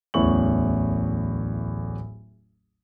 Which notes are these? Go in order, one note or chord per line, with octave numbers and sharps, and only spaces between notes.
D1 A1 E2 A2 C#6 F#7